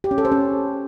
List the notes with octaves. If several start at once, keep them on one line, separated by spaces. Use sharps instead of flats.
G4
C#4
A4
C5
C#4